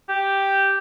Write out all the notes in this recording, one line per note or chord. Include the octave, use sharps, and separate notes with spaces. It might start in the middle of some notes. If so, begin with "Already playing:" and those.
G4